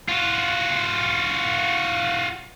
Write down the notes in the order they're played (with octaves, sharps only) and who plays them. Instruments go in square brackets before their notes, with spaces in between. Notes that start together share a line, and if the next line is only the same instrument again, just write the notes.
[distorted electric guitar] F4 F#4